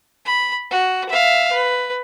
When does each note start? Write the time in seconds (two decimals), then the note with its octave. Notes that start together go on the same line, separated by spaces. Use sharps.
0.25 B5
0.71 F#4
1.09 E5 F5
1.52 B4